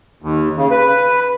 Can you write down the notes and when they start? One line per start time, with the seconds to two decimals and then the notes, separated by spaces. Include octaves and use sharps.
0.22 D#2
0.57 C#3
0.71 B4